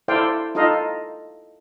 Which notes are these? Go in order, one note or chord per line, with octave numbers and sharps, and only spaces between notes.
E4 A4 C5 D5 F5 G5
D#4 F4 A4 D#5 F5